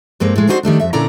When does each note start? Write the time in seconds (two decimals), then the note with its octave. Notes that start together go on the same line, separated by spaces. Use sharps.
0.20 G2 G#3 A#3 C4
0.36 A2 G#3
0.47 C4 D4 D#4 F#4 G#4 C5
0.63 D#3 G3 A3 D4
0.80 F2 E5
0.93 A#2 D3 C#4 E4 D5 A#5